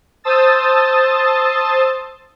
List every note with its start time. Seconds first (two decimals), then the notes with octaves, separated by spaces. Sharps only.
0.24 C5 A5 D#6 E6 A6